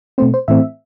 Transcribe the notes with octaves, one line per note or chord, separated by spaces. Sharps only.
B2 A3 C4 C5
C5
A2 E3 A3 C4 E5